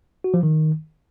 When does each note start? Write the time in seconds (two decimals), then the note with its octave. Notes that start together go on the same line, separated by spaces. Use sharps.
0.24 F#4
0.34 F3
0.43 D#3